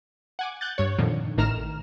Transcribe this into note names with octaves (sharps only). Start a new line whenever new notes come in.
F#5 G#5 D6
F#6 G6 A6
G2 C#5
F2 A#2 D3 D#3
A1 A2 D#3 A#5 F6 E7